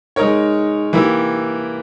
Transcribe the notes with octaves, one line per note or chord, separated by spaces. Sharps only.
G#3 D#4 A#4 C#5
E3 A#3 E4 G4